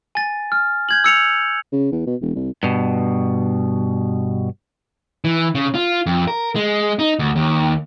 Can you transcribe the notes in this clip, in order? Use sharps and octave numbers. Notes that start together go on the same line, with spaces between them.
G#5 A6
F6
G6 G#6 F#7
E6 C#7 F7
C#3
E2
B2
E1
C2
G2 B2
E3
C#3
F4
F2
A#4
G#3
D#4
D2
D#2